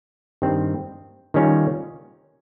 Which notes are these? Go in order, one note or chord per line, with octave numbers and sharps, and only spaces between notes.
G2 D#3 G3 C4
D#3 G3 C#4 F4